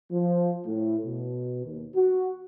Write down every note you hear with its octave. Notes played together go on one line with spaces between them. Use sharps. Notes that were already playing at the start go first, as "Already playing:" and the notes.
F3
A2
B2
D#2
F#4